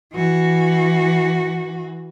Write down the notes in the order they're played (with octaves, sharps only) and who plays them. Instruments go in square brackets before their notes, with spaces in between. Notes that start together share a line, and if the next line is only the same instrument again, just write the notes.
[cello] E3 F#4